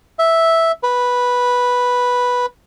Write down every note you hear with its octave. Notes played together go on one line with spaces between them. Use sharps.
E5
B4